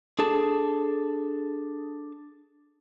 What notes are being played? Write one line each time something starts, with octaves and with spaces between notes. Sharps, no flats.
D4 G#4 A4 A5